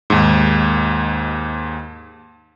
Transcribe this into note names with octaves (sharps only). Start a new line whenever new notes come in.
D#2 G#2